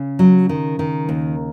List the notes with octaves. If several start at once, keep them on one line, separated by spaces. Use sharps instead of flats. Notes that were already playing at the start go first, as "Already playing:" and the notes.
Already playing: C#3 C#4
F#3
D#3
D#3
D#2